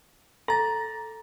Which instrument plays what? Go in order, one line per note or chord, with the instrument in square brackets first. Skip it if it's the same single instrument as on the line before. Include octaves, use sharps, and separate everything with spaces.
[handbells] A4 A6 [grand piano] A#5